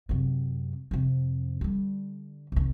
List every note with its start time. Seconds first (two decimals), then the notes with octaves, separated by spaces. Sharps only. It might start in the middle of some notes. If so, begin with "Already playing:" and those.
0.09 F#2 C3
0.91 F2 C3
1.61 D3 G3
2.52 C2 D#3